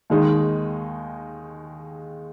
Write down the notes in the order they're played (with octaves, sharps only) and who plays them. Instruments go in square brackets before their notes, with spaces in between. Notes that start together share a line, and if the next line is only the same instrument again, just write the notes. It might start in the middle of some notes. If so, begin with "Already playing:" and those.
[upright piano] D#2 D#3 G#3 D#4